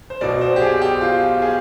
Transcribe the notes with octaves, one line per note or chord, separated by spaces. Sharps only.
C5
B1 B2 D5
C5
G4
G#4
G4
F4
G#4